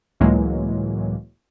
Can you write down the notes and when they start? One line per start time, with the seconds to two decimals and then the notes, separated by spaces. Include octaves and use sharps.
0.20 C#2 A2 E3 F#3 G#3 A#3